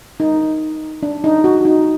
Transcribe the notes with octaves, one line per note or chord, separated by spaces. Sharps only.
D#4
D4
D#4
F#4
D#4